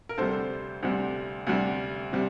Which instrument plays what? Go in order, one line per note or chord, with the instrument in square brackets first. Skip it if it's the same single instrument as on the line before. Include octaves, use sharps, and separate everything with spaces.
[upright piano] A#4
D2 C3 G3 A4 C5
D2 C3 G3
D2 C3 G3
C3 G3